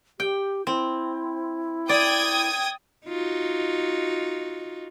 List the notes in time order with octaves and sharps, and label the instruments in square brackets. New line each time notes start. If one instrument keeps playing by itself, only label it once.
[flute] G4 [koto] G5
[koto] C4 [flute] E4
[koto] D5 [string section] G5 D#6 G#6
[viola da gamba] D#4 F4 F#4